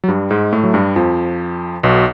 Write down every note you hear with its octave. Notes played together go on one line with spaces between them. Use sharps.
F#3
G2 G3
G#2 G#3
A2 A3
F#3
G2 G3
F2 F3
B1 B2